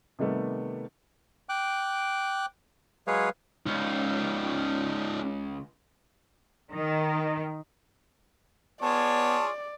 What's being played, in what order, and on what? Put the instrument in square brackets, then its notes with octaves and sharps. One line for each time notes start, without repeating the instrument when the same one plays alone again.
[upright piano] C3 D#3 G3 A3 B3
[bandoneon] G5 D6 F#6
F#3 G#3 G#4 B4 C#5 F5
[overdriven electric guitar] C#2 [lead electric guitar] C#4 D#4
[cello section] D#3
[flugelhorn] B3 [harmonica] F4 G#4 C#5 [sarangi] D5 [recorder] A5